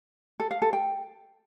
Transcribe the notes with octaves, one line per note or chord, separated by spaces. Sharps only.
A4
F5
A4
G5